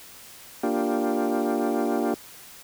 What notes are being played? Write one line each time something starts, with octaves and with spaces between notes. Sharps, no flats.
A#3 D4 F4 G4